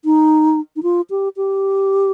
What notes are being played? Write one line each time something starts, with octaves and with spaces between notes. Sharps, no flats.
D#4
D#4
F4
G4
G4